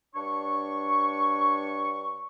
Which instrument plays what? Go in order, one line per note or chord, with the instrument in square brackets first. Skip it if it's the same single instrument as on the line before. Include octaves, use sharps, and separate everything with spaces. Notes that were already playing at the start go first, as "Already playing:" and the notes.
[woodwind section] G2 D4 C#5 C#6